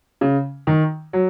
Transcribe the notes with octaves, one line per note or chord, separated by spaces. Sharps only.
C#3
D#3
F#3